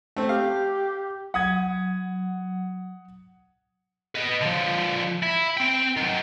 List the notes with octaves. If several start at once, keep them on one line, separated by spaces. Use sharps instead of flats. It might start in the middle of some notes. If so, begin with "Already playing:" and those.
A3 C4
G4 F5
F#3 F#5 D#6 G#6
B4 D#5
D3 F3
E4
C4 G5
D#3 F#3